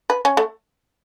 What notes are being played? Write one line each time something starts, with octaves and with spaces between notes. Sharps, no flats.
B4
C#4
A3